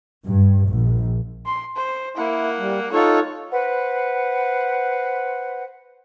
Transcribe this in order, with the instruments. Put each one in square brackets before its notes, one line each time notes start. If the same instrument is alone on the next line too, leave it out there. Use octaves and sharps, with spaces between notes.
[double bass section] G2
A#1
[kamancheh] C6
C5
[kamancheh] A#3 F#5 [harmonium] E4
[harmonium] G3
[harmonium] D#4 F4 A4 [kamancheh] C#5 F#5
[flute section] B4 C5 F#5